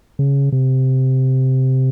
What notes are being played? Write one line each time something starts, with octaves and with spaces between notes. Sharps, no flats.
C#3
C3